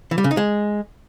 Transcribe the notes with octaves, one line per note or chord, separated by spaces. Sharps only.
E3
G3
C#3
D#4
G#3